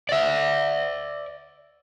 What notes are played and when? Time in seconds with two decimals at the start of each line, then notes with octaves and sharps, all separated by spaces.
0.09 D5 E5